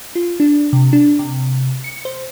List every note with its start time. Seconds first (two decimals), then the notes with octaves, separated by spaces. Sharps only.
0.15 F4
0.40 D4
0.73 C3
0.93 D4
1.19 C3
1.84 C#7
2.05 C5